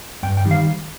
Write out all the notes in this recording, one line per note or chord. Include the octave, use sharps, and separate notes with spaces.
G2 G5
G5
D#3 G3
F5